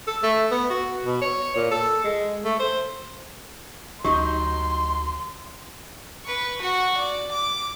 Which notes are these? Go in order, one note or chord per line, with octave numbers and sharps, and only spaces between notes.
A4
A3
B3
F#4
B2
C#5
A#2
A4
G#3
A3
C5
D2 F#3 D#4 G4 C6
B4 C#6
F#4 F#5
D5
D6